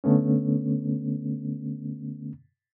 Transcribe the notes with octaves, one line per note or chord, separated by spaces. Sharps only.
D3 A3 B3 C#4